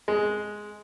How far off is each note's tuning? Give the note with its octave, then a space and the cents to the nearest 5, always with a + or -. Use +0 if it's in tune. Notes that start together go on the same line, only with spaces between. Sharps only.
G#3 +5